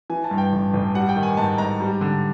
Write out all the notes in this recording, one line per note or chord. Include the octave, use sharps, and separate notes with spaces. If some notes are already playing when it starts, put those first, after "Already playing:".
E3 G#5
A5
G2
G5
A1
A1
G3 F#5
G5
D#3
G#5
G#2 A5
G#2 A#5
G3
D3